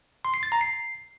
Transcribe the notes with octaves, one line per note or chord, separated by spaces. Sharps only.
C6
C7
A6
A#5
C7